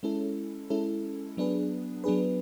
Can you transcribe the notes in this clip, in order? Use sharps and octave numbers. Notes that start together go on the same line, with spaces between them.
G#3 C#4 E4 A4
G#3 C#4 E4 A4
F#3 B3 D4 G#4 B4
F#3 B3 D4 G#4 B4